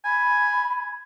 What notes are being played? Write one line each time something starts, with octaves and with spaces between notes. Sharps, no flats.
G#5 B5